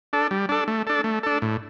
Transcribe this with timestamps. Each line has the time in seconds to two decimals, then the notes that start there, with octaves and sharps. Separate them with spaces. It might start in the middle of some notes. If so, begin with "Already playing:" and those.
0.13 D4 A4
0.31 G3
0.49 D4 A4
0.68 A3
0.87 D4 A4
1.04 A3
1.23 D4 A4
1.42 A2